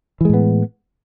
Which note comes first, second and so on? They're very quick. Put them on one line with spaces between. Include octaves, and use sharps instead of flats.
E3 G#3 A2 B3